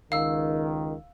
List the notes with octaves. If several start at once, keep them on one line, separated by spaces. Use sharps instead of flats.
C#2 D#3 F5 E6